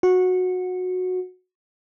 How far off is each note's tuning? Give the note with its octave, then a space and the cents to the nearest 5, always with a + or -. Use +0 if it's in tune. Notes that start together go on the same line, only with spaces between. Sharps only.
F#4 -15